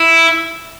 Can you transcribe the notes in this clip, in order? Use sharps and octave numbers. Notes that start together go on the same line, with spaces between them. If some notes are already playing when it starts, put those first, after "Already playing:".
Already playing: E4